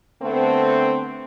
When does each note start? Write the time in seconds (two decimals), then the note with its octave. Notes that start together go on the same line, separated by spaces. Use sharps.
0.21 D3 A3 B3 C4